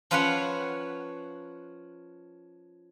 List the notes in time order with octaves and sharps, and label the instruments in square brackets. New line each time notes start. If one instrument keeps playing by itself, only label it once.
[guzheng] F3 C#4 F4 B4 F5 F#5